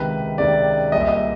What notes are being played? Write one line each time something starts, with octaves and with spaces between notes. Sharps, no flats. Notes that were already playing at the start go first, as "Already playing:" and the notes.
Already playing: C#2 C3 D#3 B4
C#2 C3 D#3 D5
C2 A#2 D#5
E5
D#5